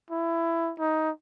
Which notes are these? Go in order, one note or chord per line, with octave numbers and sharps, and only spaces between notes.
E4
D#4